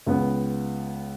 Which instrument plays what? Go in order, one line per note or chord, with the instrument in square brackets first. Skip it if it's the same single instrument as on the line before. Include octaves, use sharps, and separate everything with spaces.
[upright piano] C#2 B3